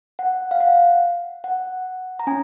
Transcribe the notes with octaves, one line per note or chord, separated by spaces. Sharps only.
F#5
F5
F#5
F#5
A#5
C#4 G#5